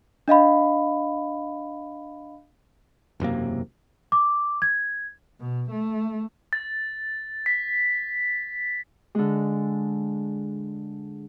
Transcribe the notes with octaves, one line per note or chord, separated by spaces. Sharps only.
D4 D#5 F5 B5
E1 F#2 C3 A#3
D6
G#6
B2
A3
A6
B6
D3 G#3